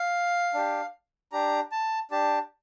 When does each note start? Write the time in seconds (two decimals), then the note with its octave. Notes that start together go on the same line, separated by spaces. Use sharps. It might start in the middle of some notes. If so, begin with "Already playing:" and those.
Already playing: F5
0.54 D4 G4
1.32 D4 G4 A#5
1.72 A5
2.11 D4 G4 A5